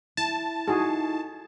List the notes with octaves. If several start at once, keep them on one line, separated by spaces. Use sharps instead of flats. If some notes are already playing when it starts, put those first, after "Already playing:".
E4 A5
D#4 E4 F#4 G#4 A4